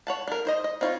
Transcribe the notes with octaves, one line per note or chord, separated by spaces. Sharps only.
C#5 F#5 A5
D4 A#4
D#4 C5 D#5
D#5
C4 D#4 F4 C#5